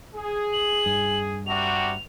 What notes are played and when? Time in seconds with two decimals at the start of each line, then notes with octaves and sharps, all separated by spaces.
0.14 G#4
0.53 F#7
0.86 G2
1.47 C3 G3 F#4 F7